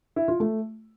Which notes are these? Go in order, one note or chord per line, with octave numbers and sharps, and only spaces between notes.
E4
F4
A3